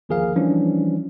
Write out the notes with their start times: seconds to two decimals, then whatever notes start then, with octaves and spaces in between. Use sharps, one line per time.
0.09 G1 D#2 F3 G#4 A#4 F5
0.36 E3 F3 G3 C#4 D4